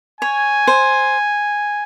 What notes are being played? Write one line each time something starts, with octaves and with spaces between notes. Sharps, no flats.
C#5 G#5
C5